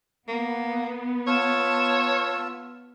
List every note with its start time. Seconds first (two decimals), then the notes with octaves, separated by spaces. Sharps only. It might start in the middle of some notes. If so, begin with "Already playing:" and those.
0.28 A#3 B3
1.27 F4 C#5 A5 E6